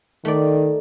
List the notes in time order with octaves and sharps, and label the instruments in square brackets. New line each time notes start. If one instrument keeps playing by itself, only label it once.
[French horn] D#3 [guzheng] A3 D5